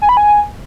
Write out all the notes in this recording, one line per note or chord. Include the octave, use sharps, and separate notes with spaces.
G#5
B5
G#5